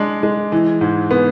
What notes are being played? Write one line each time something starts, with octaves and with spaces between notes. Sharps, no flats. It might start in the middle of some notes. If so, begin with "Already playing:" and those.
Already playing: G#3 D4
G#3
E3
G#2
B3